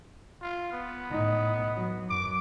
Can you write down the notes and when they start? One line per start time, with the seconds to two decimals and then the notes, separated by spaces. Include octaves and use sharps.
0.42 F4
0.73 B3
1.10 A2 D#4
1.75 F#3
2.10 F#2 D6